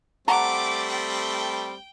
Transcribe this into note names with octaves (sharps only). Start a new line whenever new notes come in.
G3 A3 C4 F#5 A5 A#5 D6
G5